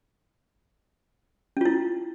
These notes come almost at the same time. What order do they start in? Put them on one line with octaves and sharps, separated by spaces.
C#4 F4 E4